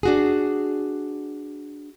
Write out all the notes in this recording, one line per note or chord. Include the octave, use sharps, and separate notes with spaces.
D4 F#4 G#4